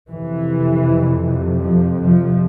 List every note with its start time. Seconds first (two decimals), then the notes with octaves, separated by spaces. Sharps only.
0.10 F2 C3 E3
1.63 F3
2.01 F3